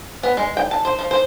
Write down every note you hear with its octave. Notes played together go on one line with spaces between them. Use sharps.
B3
G#3
G5
A5
C5
F3
C5